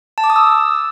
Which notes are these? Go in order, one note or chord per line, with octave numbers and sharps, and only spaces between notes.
A5
D6
D#6
E6